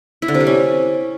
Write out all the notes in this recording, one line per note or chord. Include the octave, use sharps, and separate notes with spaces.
E4
D3
C3
G3
C#4